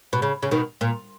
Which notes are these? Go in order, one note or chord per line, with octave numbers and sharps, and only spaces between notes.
B2
C#3
C#3
B2 D#3
A#2